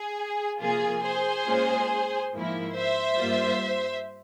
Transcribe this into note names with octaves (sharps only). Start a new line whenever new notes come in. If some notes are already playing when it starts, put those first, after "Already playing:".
Already playing: G#4
C3 F3 A#3 F4 G#4
G#4 C5
A#2 G#3 C#4 F4
G#2 F3 A#3 E4
C5 E5
G2 G3 A#3 F4